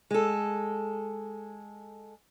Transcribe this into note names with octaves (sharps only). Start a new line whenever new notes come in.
G#3 A4